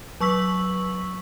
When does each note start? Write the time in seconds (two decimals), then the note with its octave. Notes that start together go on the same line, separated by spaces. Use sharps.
0.21 F#3 C#6 E6 B6 F#7